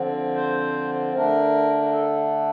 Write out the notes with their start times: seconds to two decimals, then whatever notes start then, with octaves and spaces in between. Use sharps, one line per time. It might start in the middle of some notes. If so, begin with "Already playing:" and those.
Already playing: D3 F3 C4
0.35 C5
1.14 D3 A3 D4 A#4
1.82 A#4
1.92 A4